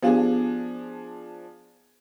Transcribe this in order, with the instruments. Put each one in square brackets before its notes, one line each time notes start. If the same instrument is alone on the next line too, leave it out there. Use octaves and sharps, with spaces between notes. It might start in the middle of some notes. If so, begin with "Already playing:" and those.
[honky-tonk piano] F3 D4 G#4 [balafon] B3 G4 F5